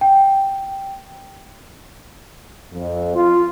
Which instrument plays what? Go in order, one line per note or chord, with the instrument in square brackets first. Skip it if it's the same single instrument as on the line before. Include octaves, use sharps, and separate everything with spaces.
[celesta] G5
[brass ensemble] F2
F4